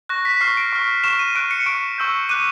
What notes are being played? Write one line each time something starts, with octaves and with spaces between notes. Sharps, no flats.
C#6 F#6 A#6
B6
C#6 F6 C7
D7
C#6 F6
C#6 F6 E7
D#7
C#6 F#6 D7
C#7
C#6 F6 D7
C#6 E6 G6
D6 F#6 D#7